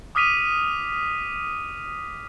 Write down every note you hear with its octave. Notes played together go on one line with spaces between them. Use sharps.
D6 D#6 F6 B6 D#7 F7